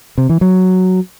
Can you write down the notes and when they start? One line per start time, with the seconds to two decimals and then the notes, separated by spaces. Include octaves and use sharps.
0.18 C3
0.29 E3
0.41 F#3